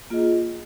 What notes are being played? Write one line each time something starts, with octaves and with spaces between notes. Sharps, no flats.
A#3 F4 G#4 D#5